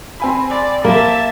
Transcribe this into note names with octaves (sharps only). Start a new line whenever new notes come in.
C4 G#5 B5
D5
A#3 E5 A5